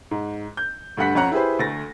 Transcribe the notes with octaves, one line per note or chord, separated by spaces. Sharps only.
G#2
G6
D2 G2 D3 F#5 B6
F2 C#4 C#5 F#5 A#5
E4 G4 G#4 B4 C5
D2 A3 A6 A#6